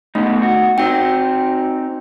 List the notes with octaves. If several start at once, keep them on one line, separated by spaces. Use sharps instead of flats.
B2 A3 C#4 D#4
F#4
C4 D#4 F#4 G5